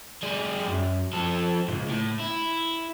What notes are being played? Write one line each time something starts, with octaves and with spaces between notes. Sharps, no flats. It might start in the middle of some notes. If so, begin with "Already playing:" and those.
G3 G#4
F#2
F3 A4
C#2 G#2
A2
E4